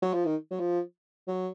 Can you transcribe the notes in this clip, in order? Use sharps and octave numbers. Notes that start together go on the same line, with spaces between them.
F#3
F3
D#3
F#3
F3
F#3